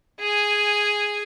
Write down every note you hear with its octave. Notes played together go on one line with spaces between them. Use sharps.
G#4 G#5